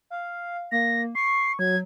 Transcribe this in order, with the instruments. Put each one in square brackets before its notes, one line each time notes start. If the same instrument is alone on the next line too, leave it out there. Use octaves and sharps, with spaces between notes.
[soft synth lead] F5
[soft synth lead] A#3 [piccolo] A#6
[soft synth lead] C#6 [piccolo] C7
[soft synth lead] F#3 [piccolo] G#6